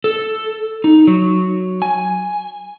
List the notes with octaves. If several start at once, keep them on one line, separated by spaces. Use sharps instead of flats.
A4
D#4
F#3
G#5